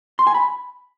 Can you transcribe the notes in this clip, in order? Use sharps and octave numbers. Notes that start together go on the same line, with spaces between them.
C6
G#5
B5